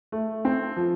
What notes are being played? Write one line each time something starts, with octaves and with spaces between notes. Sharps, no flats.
A3
C4
F3